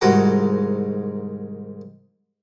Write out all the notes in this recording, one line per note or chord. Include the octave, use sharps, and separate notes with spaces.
C2 G#2 D#3 F#4 G5 A#5